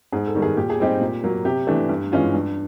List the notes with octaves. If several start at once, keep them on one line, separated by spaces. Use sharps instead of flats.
G#2 G#4
A4
D#3 G3
G#4
A#2 G4
G#4
G3 C4 D#4 G4
A#2
F#3 A#3
C3 G4
E3 A3 D4
G2
E3 G#3 C#4 F4
G2